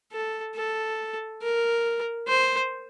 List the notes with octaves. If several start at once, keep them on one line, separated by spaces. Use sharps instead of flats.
A4
A4
A#4
C5